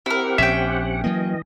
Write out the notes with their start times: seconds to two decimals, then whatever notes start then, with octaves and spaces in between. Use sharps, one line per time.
0.06 C4 E4 G4 A#4 F#5
0.38 A#1 C#4 E5 G5
1.04 E3 F#3 A#3 D#5